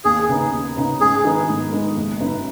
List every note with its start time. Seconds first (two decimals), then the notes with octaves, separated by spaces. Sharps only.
0.04 D#2 G#4
0.29 C#3 B3 D#4
0.52 D#2
0.77 C#3 B3 D#4
1.01 G#2 G#4
1.24 D#3 G#3 B3 D#4
1.48 G#2
1.72 D#3 G#3 B3 D#4
1.97 F#1
2.20 F#2 C#3 B3 D#4